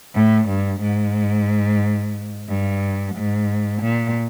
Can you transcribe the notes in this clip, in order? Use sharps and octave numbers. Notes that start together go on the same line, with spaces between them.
A2
G2
G#2
G2
G#2
A#2